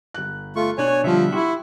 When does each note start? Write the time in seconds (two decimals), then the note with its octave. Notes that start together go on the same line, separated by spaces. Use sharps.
0.14 G1 F#6
0.56 A3 F4 C#6
0.78 B2 D4 C#5 G#5 F#6
1.04 D3 F3 G3 E5
1.32 E4 F#4 G4 C6 C#6